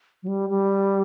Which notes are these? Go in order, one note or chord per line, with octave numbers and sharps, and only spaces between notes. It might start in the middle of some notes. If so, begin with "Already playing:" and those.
F#3
G3
G3